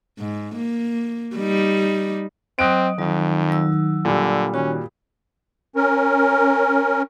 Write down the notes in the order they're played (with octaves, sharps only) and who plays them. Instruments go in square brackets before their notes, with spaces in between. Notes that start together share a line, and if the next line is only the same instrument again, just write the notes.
[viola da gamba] G#2
A#3
G3 D#4
[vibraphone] F#3 D#5 [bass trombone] C4 [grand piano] D#6 F#6 D7
[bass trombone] F2 [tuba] D#3 [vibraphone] F#3
[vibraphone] F#3 E6
[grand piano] A#2 G3 [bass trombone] D3
[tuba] D#3 [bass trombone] C#4 [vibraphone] F#4
[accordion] C#4 A#4